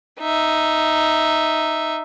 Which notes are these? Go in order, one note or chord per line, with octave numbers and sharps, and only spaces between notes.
D#4 E5